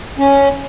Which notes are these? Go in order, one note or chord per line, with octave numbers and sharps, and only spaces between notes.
C#4